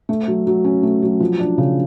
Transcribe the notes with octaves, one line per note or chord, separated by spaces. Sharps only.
A3
F#3
F#3
C#4
A3
F#3
F3
D4
C#3